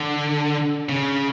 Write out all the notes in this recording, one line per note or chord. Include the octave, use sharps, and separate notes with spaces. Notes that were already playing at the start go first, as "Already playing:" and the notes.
Already playing: D3
C#3